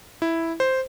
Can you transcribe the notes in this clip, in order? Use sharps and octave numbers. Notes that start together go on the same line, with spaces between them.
E4
C5